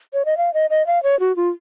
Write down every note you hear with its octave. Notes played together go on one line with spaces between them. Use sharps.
C#5
D#5
F5
D#5
D#5
F5
C#5
F#4
F4